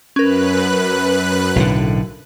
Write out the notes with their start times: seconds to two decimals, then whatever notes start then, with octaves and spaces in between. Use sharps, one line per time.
0.16 F#2 C#4 A#4 B4 F#6
1.56 B1 A2 D3